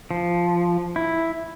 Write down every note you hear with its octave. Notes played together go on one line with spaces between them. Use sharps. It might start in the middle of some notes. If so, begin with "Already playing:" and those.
F3
E4